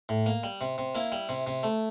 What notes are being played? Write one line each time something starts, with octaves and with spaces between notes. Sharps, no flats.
A2
A#3
G3
C3
C3
A#3 E4
G3
C3
C3
A3